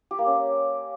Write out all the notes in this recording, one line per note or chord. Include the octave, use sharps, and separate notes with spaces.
G4
A#3
C#4